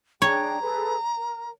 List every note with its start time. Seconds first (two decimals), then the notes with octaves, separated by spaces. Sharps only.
0.22 D4 G#4 C#5 G5 A#5
0.62 G#4 A4 B4
1.16 A#4